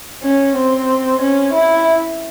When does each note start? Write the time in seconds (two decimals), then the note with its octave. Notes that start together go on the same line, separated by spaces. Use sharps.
0.23 C#4
0.56 C4
1.21 C#4
1.53 E4